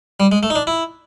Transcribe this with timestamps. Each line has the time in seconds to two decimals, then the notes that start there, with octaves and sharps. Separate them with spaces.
0.20 G3
0.32 G#3
0.43 A3
0.50 D#4
0.55 D4
0.67 E4